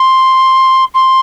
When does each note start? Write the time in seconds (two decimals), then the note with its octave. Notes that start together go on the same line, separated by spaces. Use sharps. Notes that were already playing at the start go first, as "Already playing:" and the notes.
Already playing: C6
0.94 C6